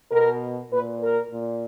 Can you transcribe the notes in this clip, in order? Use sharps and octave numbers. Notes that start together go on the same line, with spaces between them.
B2 A#4
A#2 B4
A#4
A#2